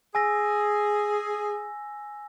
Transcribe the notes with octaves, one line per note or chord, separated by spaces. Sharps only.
G#4 G#5 E6 A#6